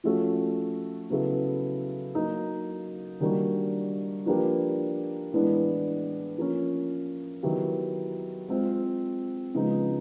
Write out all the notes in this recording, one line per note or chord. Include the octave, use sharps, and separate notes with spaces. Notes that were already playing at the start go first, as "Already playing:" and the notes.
F3 A3 C#4 F#4 A4
C#3 F#3 B3 E4 A4
F#3 A#3 D#4
D#3 G3 A#3 D4 F#4
F3 A#3 D4 G4 B4
A2 E3 G#3 B3 D4
F3 A#3 C#4
D#3 F#3 B3 E4 G4
G#3 C4 F4
C#3 F3 G#3 B3 D#4